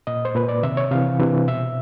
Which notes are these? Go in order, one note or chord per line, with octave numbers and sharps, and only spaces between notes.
A#2 D#5
C5
A#2 B4
D5
C3 D#3 E5
C#5
C3 E3 F5
C3 E3
B2 E5